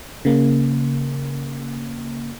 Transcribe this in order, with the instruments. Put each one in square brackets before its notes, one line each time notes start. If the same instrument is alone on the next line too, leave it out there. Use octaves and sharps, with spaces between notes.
[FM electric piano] C#3 A#3